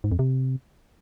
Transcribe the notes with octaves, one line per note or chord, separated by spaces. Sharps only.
G#2
F2
C3